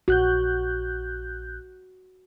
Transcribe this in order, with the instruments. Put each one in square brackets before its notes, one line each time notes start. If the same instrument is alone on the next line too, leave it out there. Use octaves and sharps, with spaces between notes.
[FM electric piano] A#1 F#6 G6 [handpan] F#4